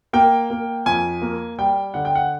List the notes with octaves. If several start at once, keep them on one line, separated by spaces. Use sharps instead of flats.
A#3 G5
A#3
F2 G#5
A#3
G3 G5
D3 F#5
G5
F#5